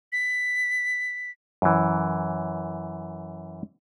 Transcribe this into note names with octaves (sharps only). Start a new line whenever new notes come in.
B6
F#2 E3